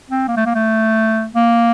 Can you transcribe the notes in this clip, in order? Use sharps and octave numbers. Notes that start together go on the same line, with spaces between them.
C4
A#3
A3
A#3
A3
A#3